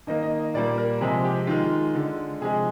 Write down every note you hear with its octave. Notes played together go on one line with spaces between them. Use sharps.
D#3 A#3 D#5
D#5
D#5
A#2 G3 A#3 D5
A#4
C3 F3 G#3 G#4
G4
D#3 G#3 F4
D3 G#3
C3 F3 G#3 G#4